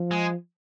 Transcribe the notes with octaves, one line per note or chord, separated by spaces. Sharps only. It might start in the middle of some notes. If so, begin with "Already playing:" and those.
Already playing: F3
G#3